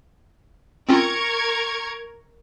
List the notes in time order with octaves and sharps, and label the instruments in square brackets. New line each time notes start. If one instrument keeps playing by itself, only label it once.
[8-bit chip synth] C4 C#4 F4 [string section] A#4 C#6 G#6